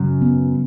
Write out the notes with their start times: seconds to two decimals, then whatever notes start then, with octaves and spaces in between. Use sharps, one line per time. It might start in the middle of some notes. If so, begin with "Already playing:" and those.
Already playing: F#2 C#3
0.22 B3